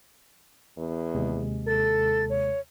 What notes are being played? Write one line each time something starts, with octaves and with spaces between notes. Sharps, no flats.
E2
D#2 C3 G#3
A4 A6
C#5